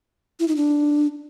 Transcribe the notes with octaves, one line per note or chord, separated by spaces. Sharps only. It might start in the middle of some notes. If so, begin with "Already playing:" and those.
E4
D#4
D4